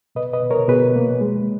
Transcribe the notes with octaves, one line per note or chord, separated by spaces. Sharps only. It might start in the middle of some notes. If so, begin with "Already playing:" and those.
B2 B4 D#5
B4 D#5
B2
A#4 C#5
B2 G#4 B4
A#3
G#3